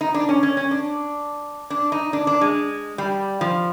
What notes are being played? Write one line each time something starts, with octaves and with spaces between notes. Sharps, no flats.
D#4
D4
C#4
C#4
C#4
D4
D4
D#4
D4
D4
G#3
G3
F3